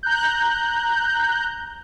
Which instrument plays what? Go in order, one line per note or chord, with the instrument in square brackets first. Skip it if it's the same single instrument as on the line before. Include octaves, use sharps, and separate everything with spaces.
[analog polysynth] A#5 F#6 G6